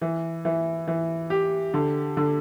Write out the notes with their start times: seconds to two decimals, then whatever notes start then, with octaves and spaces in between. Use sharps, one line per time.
0.01 E3
0.45 E3
0.87 E3
1.30 G4
1.74 D3
2.17 D3